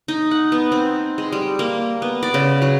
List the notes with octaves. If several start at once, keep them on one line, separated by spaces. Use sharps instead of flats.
D#4
F#5
B3
C4
G#3
G3
A#3
B3
D5
C#3
F#3